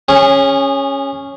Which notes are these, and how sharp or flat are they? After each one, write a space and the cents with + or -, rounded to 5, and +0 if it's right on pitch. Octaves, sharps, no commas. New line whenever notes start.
C#4 -5 G#4 -30